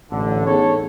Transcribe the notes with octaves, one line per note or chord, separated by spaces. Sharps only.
A1 D3
B3 D#4 G#4 A4 C#5